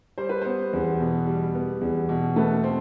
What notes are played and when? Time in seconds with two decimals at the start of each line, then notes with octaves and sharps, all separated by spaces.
0.18 G3 C5
0.29 B4
0.41 B3 C5
0.73 E2
1.00 B2
1.27 G3
1.55 B3
1.81 E2
2.09 B2
2.36 A3 B4
2.63 C4